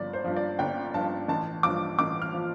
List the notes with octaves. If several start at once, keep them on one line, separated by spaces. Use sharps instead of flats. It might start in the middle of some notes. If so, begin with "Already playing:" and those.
Already playing: G1 G2 F3 D5
C5
G2 F3
D5
G1 G5
G2 F3 A5
A1 A5
G2 F3 D6
A1 D6
F6
F3